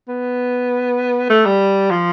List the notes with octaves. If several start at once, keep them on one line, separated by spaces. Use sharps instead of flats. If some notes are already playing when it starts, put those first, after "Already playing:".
B3
A3
G3
F3